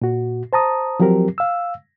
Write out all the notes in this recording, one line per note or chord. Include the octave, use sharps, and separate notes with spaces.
A#2 F#4
C5 A5 A#5 D#6
F3 F#3 C4 G4 A#4
F5 E6